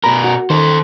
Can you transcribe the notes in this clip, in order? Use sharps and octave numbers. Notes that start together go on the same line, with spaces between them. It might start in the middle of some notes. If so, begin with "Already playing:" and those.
B2 A#4 A#5 B5
F#4
D#3 A4 C5